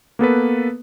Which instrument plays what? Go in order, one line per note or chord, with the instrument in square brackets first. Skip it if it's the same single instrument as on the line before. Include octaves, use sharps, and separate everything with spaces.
[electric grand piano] A#3 B3 A4 B4